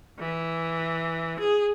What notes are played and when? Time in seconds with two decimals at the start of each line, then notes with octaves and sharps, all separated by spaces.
0.18 E3
1.37 G#4